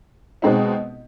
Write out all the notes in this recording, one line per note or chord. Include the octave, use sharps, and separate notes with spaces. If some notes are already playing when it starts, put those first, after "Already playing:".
B2 G#3 C4 D#4